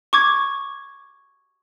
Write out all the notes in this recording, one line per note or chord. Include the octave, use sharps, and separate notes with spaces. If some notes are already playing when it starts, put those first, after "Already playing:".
C#6 D6 G#6